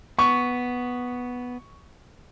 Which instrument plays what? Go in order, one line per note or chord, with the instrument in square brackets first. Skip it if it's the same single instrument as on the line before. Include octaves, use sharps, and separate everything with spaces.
[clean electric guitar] B3 [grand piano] C#6